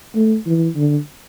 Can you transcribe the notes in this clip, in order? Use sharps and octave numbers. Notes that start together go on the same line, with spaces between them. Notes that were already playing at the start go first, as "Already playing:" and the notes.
A3
E3
D3